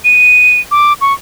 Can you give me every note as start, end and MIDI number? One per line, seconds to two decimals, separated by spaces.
0.04 0.60 99
0.71 0.93 86
1.01 1.13 85